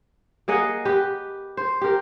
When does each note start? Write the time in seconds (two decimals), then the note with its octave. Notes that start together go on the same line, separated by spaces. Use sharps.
0.48 A#3 G#4 D#5 F#5
0.85 G4 B4
1.57 C5
1.81 G4 A#4